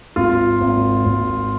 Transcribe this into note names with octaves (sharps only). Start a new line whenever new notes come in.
G#1 F4
G#1
G#1